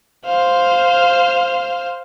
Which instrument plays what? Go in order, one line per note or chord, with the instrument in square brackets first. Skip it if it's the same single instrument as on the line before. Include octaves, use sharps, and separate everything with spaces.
[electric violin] C5 F5